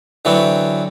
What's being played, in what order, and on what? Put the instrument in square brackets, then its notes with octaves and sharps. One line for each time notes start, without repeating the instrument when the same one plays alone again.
[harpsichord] D3 E3 F#3 B3 C4